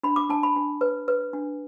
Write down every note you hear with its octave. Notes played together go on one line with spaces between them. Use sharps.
D4 B5
D6
D4 A5
B5
D4
B4
B4
D4